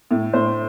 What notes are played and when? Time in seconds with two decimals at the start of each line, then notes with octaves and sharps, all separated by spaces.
0.11 A2
0.33 A2 C5